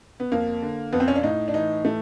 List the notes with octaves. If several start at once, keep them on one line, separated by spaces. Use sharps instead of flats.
B3
F2 A#3
D3
F2 B3
C4
C#4
D4
A2 D#4
D4
E3 D#4
A2 A3